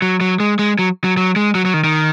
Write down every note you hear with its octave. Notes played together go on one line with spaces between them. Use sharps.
F#3
F#3
G#3
G#3
F#3
F#3
F#3
G#3
F#3
F#3
D#3
D#3